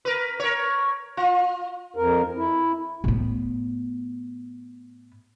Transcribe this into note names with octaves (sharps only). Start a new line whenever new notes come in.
A#4 B4
A#4 C#5
F4
F2 A#4
E4
A2 B3